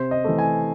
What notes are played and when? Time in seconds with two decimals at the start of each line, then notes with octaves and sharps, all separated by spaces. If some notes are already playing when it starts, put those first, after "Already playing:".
Already playing: C3 C5
0.11 D#5
0.25 E3 A3
0.38 G#5